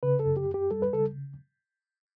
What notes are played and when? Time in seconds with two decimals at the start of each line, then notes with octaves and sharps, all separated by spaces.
0.03 C#3 B4
0.19 A4
0.26 F#2
0.37 G4
0.48 F#2
0.54 G4
0.71 G3 A4
0.82 B4
0.93 C#3 A4